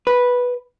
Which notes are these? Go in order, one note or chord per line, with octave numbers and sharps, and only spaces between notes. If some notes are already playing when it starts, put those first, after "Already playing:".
B4